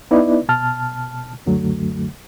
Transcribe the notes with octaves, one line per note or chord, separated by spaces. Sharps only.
B3 D#4 E4 B4 D5
B2 A5 F6
C#2 F#2 D3 F#3 A3